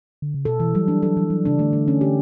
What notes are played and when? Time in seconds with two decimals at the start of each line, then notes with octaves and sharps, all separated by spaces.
0.22 D3
0.34 C#3
0.45 B2 A4
0.60 E3
0.75 F#3 G3
0.88 D4
1.03 F#3 A4
1.17 E3
1.30 F#3 G3
1.45 C#3 D4
1.59 D3 A3
1.73 A3
1.88 C#4
2.01 G4